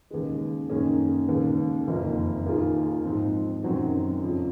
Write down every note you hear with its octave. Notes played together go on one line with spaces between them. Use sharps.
D#2 C#3 G#3
F#2 D#3 A#3 C#4 G#4
D#2 C#3 G#3
F#1 F2 D#3 A#3
D#2 D#3 A#3 F4 G#4
G#2 F3 C4
F#2 D#3 F#3 C4 F#4
F2 C#3 F3